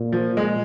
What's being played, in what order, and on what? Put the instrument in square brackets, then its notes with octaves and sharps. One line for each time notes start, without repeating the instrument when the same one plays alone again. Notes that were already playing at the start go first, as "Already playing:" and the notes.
Already playing: [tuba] A#2
[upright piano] F3
G#3